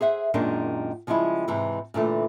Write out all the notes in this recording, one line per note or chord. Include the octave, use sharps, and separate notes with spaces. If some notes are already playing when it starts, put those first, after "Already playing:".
G#4 C5 E5 F#5
F#2 A#2 D#3 G#3 C#4 D4
C#3 F3 G3 G#3 E4
G#2 C3 E3
A#2 D3 E3 A3